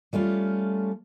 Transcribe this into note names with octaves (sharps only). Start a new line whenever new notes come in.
G3 A3 C#4 F4